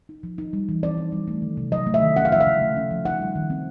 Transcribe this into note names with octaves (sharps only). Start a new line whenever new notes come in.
D#4
F3
D#4
G3
E3
C4 D5
D#4
G3
A3
D#3
C3
F#3 D#5
A3
E5
D#3
C#4 F#5
F5
F3 E5
F5
C#3
A3
C#4
F3
D#4 F#5
G3
D#3
C4